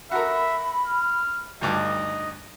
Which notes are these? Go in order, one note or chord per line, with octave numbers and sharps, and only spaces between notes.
F#4 A4 A#4 E5 B5
F6
D2 G2 D#4 D#5 D6